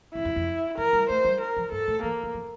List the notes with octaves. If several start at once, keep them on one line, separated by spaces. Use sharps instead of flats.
F2 E4
F2
F2
E3 A#4
G3
A3 C5
G3
A#4
F3
G2 A4
A2
E3 A#3
E3
F3